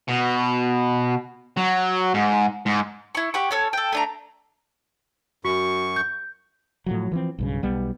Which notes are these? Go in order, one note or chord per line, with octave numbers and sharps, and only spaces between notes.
B2
F#3
G#2
G#2
E4 C#6
G4 F#5 C#6
C#4 A4 C#5
A4 G5
A3 D4 A#5
F#2 F#4 C#6
G6
A2 F3 F#3
E3 F3 C4
B1 G2 C#3
B1 G3 B3